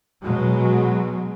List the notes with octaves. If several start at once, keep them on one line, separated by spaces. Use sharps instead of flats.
B2 F#3 G#3